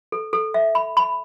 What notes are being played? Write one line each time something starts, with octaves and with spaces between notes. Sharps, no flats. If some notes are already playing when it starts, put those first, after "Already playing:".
A4
A4
E5
B5
B5